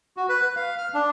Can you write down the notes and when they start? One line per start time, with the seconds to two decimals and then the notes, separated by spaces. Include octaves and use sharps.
0.17 F#4
0.29 B4
0.42 B4
0.56 F5
0.78 F6
0.94 D4